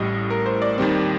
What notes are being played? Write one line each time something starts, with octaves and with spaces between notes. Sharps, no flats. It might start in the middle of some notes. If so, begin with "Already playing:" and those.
Already playing: A1 A2 G3 D#5
A#4
C5
D5
D#2 D#3 G3 C4